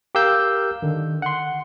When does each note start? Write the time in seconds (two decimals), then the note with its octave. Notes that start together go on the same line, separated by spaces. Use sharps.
0.15 G4 A#4 F5 E6 G6
0.82 D3 D#3
1.22 F#5 C6